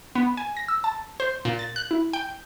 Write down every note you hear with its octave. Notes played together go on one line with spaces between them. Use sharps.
B3
G#5
A#6
E6
A5
C5
A#2
A6
F#6
E4
G5